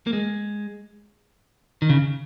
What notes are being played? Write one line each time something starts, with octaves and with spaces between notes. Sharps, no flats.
A#3
G#3
D#3
C#3